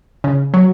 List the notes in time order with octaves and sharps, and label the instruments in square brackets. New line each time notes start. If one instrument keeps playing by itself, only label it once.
[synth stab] C#3
F#3